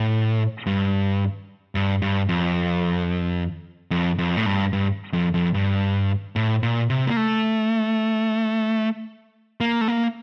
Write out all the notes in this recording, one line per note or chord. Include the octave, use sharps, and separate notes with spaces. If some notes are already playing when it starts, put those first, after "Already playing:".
Already playing: A2
G2
G2
G2
F2
F2
F2
A2
G2
G2
F2
F2
G2
A2
A#2
C3
A#3
A3
A#3
A3
A#3